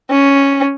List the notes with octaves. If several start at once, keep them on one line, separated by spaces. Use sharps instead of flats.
C#4